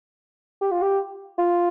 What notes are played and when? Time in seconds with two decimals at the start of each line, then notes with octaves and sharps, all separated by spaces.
0.61 G4
0.71 F4
0.82 G4
1.38 F4